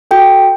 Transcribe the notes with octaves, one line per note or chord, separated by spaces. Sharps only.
F#4 A4 G5